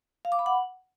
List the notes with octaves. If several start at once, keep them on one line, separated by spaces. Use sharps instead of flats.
F5
D6
B5
F#5